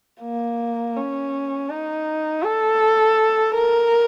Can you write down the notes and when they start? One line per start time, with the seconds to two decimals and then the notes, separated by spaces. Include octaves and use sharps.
0.21 A#3
0.96 C#4
1.69 D#4
2.43 A4
3.55 A#4